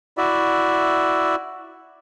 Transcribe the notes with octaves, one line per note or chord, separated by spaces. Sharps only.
E4 F#4 D5 E5